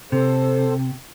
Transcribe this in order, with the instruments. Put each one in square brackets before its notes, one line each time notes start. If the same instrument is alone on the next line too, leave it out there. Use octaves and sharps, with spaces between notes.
[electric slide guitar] C3 [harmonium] A4 C5